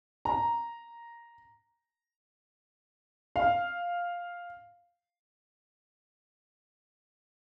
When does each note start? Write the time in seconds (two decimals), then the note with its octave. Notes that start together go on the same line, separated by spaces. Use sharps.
0.25 A#5
3.36 F5